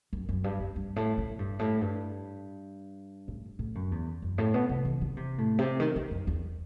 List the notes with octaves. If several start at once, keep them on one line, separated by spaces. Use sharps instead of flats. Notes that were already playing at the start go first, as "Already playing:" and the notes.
F#2
F#2
G2
G2
G2
A2
A2
G2
A2
G2
A2
A2
F#2
E2
F#2
A2
B2
C3
E3
D#3
C3
A2
C3
D#3
D#3
F#2
E2